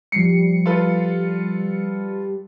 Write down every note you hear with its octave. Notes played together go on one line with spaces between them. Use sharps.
F3 G3 C7 C#7
F4 A4 B4